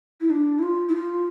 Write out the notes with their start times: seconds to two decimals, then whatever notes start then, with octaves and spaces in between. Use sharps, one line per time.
0.21 E4
0.30 D4
0.58 E4
0.62 F4
0.88 E4
0.95 F4